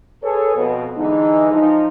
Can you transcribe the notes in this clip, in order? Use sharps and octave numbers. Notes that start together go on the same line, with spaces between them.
G#4 A4 B4 C#5
F2 B2
D3 E3 G#3 D#4
F3 D#4